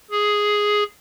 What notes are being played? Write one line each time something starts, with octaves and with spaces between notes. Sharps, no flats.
G#4